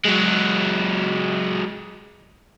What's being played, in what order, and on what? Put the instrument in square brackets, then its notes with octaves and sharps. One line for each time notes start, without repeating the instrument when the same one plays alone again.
[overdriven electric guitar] F#3 G#3